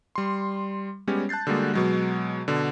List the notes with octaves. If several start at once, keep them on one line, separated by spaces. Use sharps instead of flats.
G3 C6
G3 G#3 B3 C#4 G4 C#5
A5 F#6 G6 A6 C7
D3 G3 G#3 A#3 F#4 G#4
B2 F#3 G#3
B2 D3